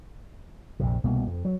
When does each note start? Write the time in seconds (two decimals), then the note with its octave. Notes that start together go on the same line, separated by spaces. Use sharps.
0.80 A#1 F2 C3
1.04 C2 B2 A#3
1.27 F2
1.45 F#3